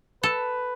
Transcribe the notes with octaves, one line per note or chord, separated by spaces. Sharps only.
A4 B4